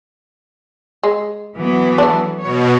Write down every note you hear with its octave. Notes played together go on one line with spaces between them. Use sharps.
G#3
E3 F#3 B3
A3 D4
B2 C#5